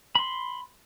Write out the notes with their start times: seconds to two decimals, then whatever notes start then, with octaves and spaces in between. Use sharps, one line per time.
0.15 B5 C6